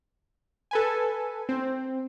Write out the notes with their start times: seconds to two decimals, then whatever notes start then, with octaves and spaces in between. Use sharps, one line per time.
0.71 A4 B4 G#5
1.49 C4